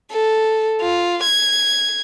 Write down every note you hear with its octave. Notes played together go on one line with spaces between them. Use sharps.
A4
F4
G#6